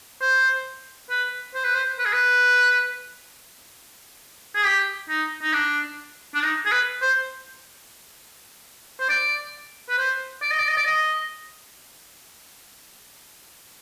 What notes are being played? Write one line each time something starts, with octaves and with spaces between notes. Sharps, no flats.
C5
B4
C5
B4
C5
B4
G#4
B4
G#4
G4
D#4
D#4
D4
D4
D#4
G#4
B4
C5
C5
D5
B4
C5
D5
D#5
D5
D#5
D5
D#5